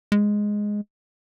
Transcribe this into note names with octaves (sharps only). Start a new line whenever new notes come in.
G#3